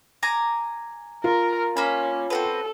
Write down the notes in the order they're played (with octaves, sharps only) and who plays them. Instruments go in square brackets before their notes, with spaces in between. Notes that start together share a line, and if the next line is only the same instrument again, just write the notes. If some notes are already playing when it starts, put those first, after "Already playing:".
[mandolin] G#5 A#5 D6
[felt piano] F4 [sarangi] A#4
[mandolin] A#3 B5 [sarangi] C#4
[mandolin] C4 F#4 B4 [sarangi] A4